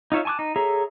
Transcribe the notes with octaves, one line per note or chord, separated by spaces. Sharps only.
D#4 F4 C#5 E5 F5
G#5 A5 C#6 D6 F#6
D#4
G#4 A4 C#5 E5 A#5